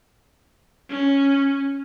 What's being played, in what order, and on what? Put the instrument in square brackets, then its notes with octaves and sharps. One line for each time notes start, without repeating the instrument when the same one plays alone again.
[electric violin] C#4